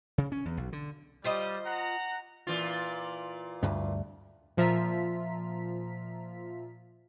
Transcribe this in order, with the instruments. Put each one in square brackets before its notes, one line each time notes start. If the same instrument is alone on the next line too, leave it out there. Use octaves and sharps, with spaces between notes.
[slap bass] C#3
C#4
E2
B1
D3
[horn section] G3 [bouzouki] F4 C5 D#5
[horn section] F#5 A#5
[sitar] A#2 E3 F4
[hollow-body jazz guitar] D2 G2
[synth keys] A#2 F3 F4 E5 A#5 B6